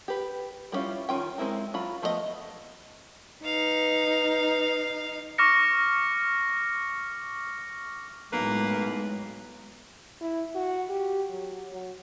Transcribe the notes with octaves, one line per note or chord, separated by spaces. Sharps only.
G4 B4
G3 B3 C#4 E4 F4
D#3 C#4 F4 G5
G#3 A#3 C4 E4 A#4
F#3 F4 B5
F3 A3 B3 G#4 D#5
D#4 B4 F5
C#6 D6 F6 A#6 C#7
B1 A2 G#3 A#3 B4
E4
F#4
G4
F#3
F#3